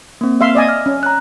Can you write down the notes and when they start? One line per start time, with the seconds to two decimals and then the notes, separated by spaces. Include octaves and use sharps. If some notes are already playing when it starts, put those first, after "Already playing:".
0.21 A#3 C4
0.41 E5 F5 C6
0.55 D5 D#5 G#5
0.69 F6
0.86 C#4
1.03 A#5 F#6